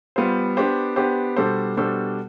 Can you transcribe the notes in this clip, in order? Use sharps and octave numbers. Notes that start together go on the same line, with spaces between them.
G3 B3 F4 C5
B3 D4 G4 C5
B3 D4 G4 C5
B2 G3 D4 A4 C5
B2 G3 D4 A4 C5